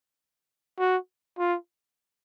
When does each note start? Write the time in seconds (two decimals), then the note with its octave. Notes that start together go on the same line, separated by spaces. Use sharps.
0.79 F#4
1.38 F4